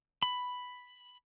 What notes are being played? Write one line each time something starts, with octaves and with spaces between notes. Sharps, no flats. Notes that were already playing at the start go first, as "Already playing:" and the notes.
B5